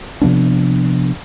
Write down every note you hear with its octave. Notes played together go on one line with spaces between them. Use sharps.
C3 F3 B3 D4